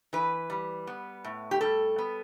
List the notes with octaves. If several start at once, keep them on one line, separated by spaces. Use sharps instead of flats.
E3 B4
G3
B3
A2
G4
G3 A4
B3